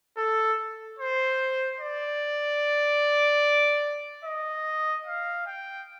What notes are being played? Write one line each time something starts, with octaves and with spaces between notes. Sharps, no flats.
A4
C5
D5
D#5
F5
G5